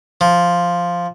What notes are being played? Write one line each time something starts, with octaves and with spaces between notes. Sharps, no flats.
F3